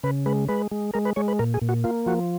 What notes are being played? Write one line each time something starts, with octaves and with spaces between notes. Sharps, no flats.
C#3 B4
G#3 B4
G#3 B4
G#3
G#3 A#4
B4
G#3 C#5
B4
A#2 A#4
G#4
A#2
F#4
A#3 F4
F3 F#4